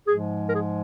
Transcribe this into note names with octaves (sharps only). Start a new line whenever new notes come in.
G#2 F3 G#3 G#4
A#4
G#4